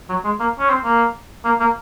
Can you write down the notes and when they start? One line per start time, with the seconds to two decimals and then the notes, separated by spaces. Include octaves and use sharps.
0.09 F#3
0.24 G#3
0.40 A#3
0.59 C#4
0.69 C4
0.84 A#3
1.45 A#3
1.60 A#3